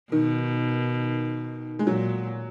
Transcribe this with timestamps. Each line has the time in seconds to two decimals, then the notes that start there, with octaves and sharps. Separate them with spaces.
0.12 B2 D#3
1.79 G#3
1.87 A#2 F#3